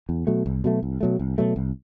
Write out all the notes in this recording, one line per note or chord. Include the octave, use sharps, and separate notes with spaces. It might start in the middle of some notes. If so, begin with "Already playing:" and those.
E2
B2 F#3 A3
C2
B2 F#3 A3
C2
B2 F#3 A3
C2
B2 F#3 A3
C2